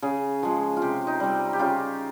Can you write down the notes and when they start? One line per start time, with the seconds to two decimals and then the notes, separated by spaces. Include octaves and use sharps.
0.02 C#3 G#4
0.43 F3 G#3
0.77 F4
0.82 C3 G4
1.07 D#4
1.20 G3 C4
1.53 G4
1.59 C#3 F4